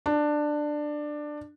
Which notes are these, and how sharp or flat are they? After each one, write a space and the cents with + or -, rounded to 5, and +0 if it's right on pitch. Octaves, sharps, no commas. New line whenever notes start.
D4 +15